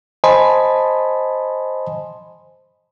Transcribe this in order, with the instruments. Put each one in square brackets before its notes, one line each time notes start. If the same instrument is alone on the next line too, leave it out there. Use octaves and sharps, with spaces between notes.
[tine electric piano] C5 D#5 G#5 A5 B5 C6